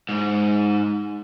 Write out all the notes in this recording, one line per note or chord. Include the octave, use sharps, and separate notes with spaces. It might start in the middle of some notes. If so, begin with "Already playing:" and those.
G#2